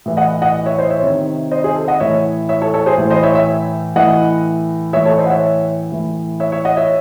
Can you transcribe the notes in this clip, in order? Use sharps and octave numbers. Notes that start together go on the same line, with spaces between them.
A2 E3
D#5 F#5
D#5 F#5
C#5 E5
C5 D#5
C#5 E5
C3 D#3
C5 D#5
G#4 C5
A4
D#5 F#5
A2 E3 C#5 E5
C#5 E5
A4 C#5
A4 C#5
G#4 C5
A2 E3
C5 D#5
C#5 E5
C#5 E5
A2 E3 D#5 F#5
A2 E3 C#5 E5
A4 C#5
C5 D#5
F#5
C#5 E5
A2 E3
C#5 E5
C#5 E5
D#5 F#5
C#5 E5